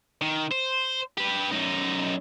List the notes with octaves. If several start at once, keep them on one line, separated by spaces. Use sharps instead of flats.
D#3
C5
G4 B4
F#2 D#4